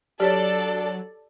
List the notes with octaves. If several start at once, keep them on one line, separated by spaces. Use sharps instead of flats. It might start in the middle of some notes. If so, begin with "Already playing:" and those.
F#3 D4 G4 A4 C#5 D5